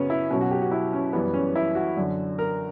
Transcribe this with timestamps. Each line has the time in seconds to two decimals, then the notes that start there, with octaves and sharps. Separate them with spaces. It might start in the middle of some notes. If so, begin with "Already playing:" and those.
Already playing: F#2 C#3 F#3 B3 C#4
0.10 E4
0.30 B2 F#3 C#4
0.41 F#4
0.51 G4
0.62 F#4
0.72 E4
0.93 C#4
1.13 F#2 E3 G3 B3
1.34 C#4
1.56 E4
1.75 F#4
1.96 F#2 D3 F#3
2.39 A#4